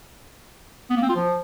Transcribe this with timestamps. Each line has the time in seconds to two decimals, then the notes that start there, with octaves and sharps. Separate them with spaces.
0.90 B3
0.96 A#3
1.03 C4
1.09 F4
1.16 F3